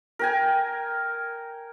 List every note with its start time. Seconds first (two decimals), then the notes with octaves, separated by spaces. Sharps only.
0.19 A#4 G5 G#5